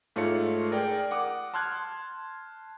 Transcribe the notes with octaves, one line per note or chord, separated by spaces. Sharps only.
G#2 A3 F4 C#5 C#7
G#4 A#4 D5 G5 D#6
F#5 D6 D#6
A5 C6 F6 F#6 G#6